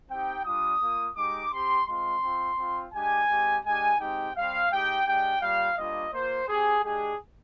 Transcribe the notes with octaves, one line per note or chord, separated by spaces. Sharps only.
C4 D#4 G4 G5
G3 D4 F4 D#6
A#3 F4
G#3 D#4 G4 D6
C4 G4 C6
G#3 C4 F4 C6
C4 F4
C4 F4
G#3 D4 G4 G#5
G#3 C4 G4
G#3 D4 G4 G#5
G#3 C4 D#4 G4 G5
G3 C4 G4 F5
G#3 D#4 G4 G5
G#3 D4 G4 G5
G3 A#3 F4 F5
G3 A#3 D4 F4 D#5
A#3 F4 C5
C4 G4 G#4
G#3 D4 G4 G#4